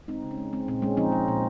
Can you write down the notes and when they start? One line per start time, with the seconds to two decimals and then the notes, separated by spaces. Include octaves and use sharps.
0.08 G#3 C4 D#4
0.23 C#3
0.31 C#4
0.38 G#3
0.53 G#3 C4
0.68 A#2 C4
0.82 G#3 C#4
0.97 F3 C4 D#4
1.12 G#3
1.28 A#2